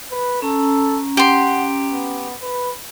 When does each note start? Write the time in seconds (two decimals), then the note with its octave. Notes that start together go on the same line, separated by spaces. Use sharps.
0.12 B4
0.42 C#4 A4 A#5
1.17 G4 F#5 C6
1.92 B3
2.42 B4